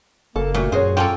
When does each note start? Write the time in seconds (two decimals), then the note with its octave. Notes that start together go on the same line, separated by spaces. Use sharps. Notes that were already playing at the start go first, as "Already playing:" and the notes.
0.36 F#1 A#3 A4
0.54 A#2 A3 F#4
0.72 F#2 F#4 G#4 C5 C#5
0.97 A#3 C#4 F4 A4 G5